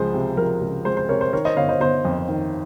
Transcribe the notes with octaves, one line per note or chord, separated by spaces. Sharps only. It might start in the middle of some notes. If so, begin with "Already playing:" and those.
Already playing: C#2 F3 G#3 C5
C3
F3 A#4
C#2
G#3 C5
C5
C3 A#4 C#5
C5
D#3 A#4 C#5
C5 D#5
G1 C#5 F5
C5 D#5
G1 C5
F2
D#3